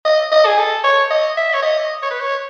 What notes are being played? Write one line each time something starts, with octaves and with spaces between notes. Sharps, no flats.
D#5
D#5
G#4
A4
C#5
D#5
E5
C#5
D#5
C#5
B4
C#5